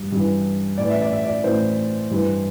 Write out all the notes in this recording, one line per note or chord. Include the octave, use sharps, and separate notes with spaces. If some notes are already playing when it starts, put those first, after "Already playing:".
Already playing: G2
G2 E3
A2 E3 D5
E5
D5
E5
D5
A2 E3 C5
G2 E3